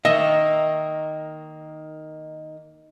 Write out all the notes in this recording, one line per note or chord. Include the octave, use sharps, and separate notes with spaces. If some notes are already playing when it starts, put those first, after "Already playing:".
D#3 A#3 D#5 E5